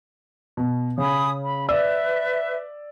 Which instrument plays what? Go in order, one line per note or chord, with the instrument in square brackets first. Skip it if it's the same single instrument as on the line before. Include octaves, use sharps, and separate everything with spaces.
[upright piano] B2
[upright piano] C#3 [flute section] G#5 B5 D#6
[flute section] B5
[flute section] B4 E5 [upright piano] D5 E6